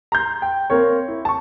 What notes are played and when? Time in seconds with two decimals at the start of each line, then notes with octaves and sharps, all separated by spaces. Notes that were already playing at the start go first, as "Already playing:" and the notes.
0.12 A#5 C6 G6
0.42 G5
0.70 A#3 C4 A#4 C#5
1.08 E4
1.25 A5 C#6